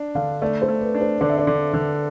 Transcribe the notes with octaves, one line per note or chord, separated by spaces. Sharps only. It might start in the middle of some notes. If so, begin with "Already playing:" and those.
Already playing: D4
D3 F5
A3 D5
C5
A3
B4
D4
C5
D3 D5
E5
D5
D3
D3